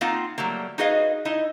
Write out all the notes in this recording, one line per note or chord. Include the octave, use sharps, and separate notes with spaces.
A#3 C4 D#4 F4 F5 F#5
F#3 G3 A3 A#3
D#4 F#4 G#4 B4 D#5 F5
D#4 E4 D#5